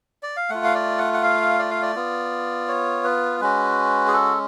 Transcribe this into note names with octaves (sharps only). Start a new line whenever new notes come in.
D5
F5
A3 F4 F#5
F5
D5
F#5
F#5
F5
D5
F5
D5
B3 F4
C#5
B4
G#3 C#4 F#4 B4
G#4
A4